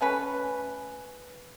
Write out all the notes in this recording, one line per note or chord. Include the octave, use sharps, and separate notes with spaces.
A3 C#4 B4